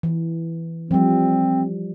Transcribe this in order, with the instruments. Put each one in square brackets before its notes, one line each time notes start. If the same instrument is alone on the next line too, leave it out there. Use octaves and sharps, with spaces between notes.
[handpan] E3
[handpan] F3 G3 [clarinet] C4